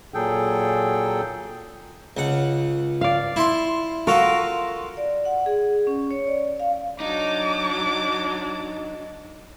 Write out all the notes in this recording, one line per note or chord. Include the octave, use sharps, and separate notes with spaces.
A#2 F#3 G#4 A4 G5
C#2 F#5
D5 F5
E4 C6
F4 F#4 A4 A#4 F5
D5
F#5
G#4
C#4
C#5
D5
F5
F#3 D4 D#4 D6